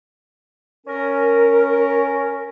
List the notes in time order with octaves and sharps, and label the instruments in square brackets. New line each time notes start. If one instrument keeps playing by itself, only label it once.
[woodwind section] C#4 A#4